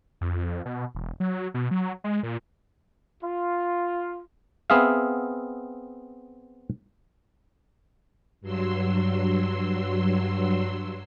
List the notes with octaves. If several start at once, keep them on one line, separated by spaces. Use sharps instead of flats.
F2
B2
E1
F#3
B2
F#3
G#3
A#2
F4
B3 C4 G#4 E5 F5
G2 F#3 C6 E6